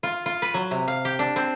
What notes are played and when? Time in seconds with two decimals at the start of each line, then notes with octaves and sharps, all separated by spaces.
0.03 F4
0.26 F4
0.42 B4
0.54 F#3
0.71 C3
0.88 F5
1.05 G4
1.19 D4
1.36 C4